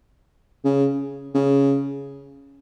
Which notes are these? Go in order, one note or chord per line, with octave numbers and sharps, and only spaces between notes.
C#3
C#3